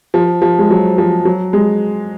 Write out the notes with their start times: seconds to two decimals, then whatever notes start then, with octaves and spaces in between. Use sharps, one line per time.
0.14 F3
0.42 F3
0.59 G#3
0.71 F#3
0.98 F3
1.25 F#3
1.53 G#3